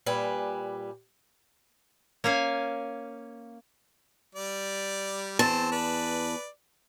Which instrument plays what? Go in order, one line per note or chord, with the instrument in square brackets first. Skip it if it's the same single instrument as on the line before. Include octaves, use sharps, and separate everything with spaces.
[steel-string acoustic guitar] A#2 G3 B4 G#5
[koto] A#3 C#4 F5 G#5
[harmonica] G3 D5
[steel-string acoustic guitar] E2 A5 [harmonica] C4
[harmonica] B4 D5